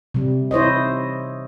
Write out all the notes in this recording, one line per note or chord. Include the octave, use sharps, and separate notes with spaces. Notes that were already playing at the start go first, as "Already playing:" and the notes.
C3 G3
E4 C5 C#5 D#5